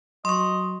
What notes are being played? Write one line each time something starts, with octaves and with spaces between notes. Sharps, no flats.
F#3 D#5 C6 C#6